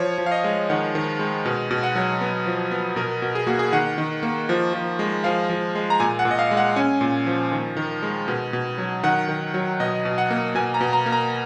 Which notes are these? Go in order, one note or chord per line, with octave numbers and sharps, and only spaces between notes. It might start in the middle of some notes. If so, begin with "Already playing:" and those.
Already playing: F3 C#5
F3
F5
D#5
G#3
D#3 F#5
D#3
G#3
B2
B2
F#5
F#3
B3
F3
B3
B2 A#4
B2
G#4
A#3 F#4
G#4
D#3 F#5
D#3
A#3
F3
F3
G#3
F3 F5
F3
G#3
A#5
A#2 G#5
F#5
A#2
D#5
F5
G#3
F#5
C#4 G#5
A#2
F3
D#3
D#3
G#3
B2
B2
F#3
D#3 F#5
D#3
F#3
B2 D#5
B2
F#5
A#3
B2 G#5
A#5
B2
A#5
A#3
A#5